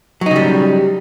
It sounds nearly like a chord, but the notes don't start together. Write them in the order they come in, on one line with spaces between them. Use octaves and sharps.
F#3 D#4 C#3 G3